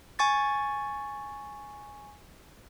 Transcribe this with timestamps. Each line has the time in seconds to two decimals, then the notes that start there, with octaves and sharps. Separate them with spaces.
0.19 G#5 C#6 A6